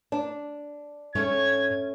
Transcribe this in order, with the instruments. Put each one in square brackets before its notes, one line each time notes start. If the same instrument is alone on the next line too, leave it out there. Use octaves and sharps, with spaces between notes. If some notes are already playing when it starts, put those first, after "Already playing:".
[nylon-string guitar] D4
[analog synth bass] G#2 [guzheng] A3 C#4 [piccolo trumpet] G#6